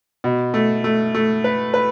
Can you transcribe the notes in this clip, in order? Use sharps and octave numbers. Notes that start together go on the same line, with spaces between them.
B2
A3
A3
A3
B4
B4